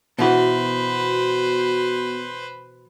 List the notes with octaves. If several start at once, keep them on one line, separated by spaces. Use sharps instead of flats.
B2 E3 B3 F#4 B4 C5